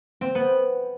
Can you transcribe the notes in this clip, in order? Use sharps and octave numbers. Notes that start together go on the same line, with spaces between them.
C4
B3